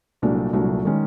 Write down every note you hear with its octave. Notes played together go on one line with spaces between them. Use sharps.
C2 A#2 F#3 A3 D4
C2 A#2 F#3 A3 D4
D#3 G#3 C#4